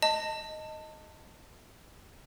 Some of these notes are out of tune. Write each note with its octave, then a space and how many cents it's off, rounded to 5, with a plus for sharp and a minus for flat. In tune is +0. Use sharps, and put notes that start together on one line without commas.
D#5 +0 A5 +25